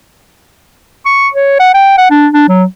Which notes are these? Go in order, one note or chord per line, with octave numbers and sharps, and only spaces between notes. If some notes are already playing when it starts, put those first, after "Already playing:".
C#6
C#5
F#5
G5
F#5
D4
D4
F#3